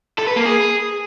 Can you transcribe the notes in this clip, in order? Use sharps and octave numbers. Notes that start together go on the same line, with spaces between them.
A4
B4
A#3
G#4